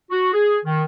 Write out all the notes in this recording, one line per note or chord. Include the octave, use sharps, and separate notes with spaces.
F#4
G#4
D#3